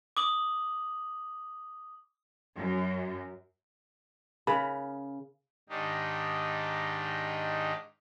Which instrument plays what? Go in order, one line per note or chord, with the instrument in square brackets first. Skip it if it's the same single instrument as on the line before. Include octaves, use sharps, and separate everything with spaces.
[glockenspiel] D6 D#6 F#7
[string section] F#2
[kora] C#3 [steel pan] A#4 B5
[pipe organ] G#2 D#3 D4 D#4 G4